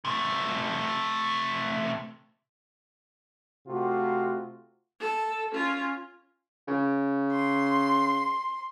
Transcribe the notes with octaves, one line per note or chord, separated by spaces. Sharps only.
C3 A3
C3 A3 F4 F#4
A4
C#4 F4
C#3
C6